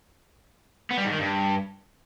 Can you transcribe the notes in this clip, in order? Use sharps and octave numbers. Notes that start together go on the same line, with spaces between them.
B3
G3
G#2
D#3
G2